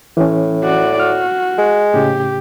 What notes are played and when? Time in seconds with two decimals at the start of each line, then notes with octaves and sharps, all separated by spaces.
0.17 A2 E3 C#4
0.64 F#4 D5
0.99 F#4 F6
1.58 G#3
1.94 A2 C#3 G4